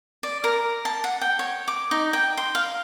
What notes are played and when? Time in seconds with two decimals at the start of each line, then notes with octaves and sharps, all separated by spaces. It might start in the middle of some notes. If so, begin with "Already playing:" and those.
0.23 D5
0.44 A#4
0.85 A5
1.04 F#5
1.21 G5
1.39 C#5
1.68 D6
1.91 D#4
2.13 G5
2.37 C6
2.55 F5